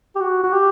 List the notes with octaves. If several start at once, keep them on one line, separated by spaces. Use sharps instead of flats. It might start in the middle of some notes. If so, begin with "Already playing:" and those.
G4
F#4
F#4
G4